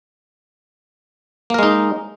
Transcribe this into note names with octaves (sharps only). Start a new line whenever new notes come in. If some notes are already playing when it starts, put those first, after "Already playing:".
G#3 A#3 D#4 A#4